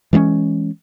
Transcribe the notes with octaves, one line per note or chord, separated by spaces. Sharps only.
E3 G#3 B3 C#4